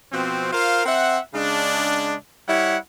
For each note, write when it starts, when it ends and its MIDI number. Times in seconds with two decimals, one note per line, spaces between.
0.12 0.51 47
0.12 0.51 53
0.12 0.51 60
0.52 0.85 65
0.52 0.85 70
0.52 0.85 72
0.52 0.85 77
0.86 1.19 60
0.86 1.19 76
0.86 1.19 78
1.34 2.15 49
1.34 2.15 56
1.34 2.15 62
2.47 2.77 55
2.47 2.77 64
2.47 2.77 73
2.47 2.77 78